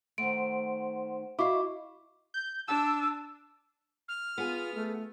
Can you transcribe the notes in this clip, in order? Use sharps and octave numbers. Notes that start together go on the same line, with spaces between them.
D#3 A3 C5 F#5 C6 D7
E4 F#4 D#5 F5 C#6 D6
G6
D4 A5 E6
F6
B3 F4 G#4
A3